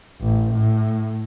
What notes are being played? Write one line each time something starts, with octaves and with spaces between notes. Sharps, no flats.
A1
A2